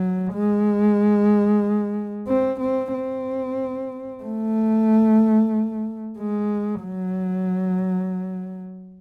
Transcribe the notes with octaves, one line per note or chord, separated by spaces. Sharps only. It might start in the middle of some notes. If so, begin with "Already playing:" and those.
Already playing: F#3
G#3
C4
C4
C4
A3
G#3
F#3